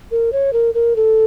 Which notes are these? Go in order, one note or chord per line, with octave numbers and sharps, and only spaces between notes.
A#4
C#5
A#4
A#4
A4